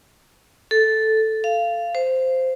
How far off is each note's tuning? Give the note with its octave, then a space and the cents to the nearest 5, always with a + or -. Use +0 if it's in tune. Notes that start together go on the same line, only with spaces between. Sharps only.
A4 -5
F5 -20
C5 -10